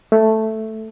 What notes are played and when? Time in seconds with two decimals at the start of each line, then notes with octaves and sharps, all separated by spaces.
0.12 A3